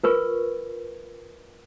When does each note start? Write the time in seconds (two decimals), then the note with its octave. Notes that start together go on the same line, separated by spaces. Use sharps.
0.04 F4 A#4 B4 C#6